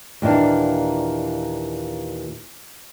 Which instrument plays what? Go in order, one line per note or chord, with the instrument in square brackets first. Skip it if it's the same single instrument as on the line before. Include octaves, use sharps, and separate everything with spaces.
[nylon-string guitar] D#2 A#2 E3 D4